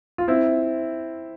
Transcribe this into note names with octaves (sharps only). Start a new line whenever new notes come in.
F4
C4 E4